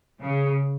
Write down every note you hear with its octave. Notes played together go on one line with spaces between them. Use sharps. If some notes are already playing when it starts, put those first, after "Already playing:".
C#3